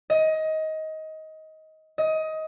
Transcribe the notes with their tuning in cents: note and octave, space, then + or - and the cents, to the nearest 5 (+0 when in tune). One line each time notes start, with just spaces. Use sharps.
D#5 +20
D#5 +20